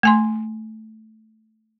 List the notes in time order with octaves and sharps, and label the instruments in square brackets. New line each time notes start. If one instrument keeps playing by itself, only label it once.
[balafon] A3 G#5 C6